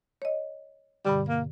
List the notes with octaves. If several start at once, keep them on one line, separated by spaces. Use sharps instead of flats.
C#5 D#5
G2 B2 D3 G3
A#3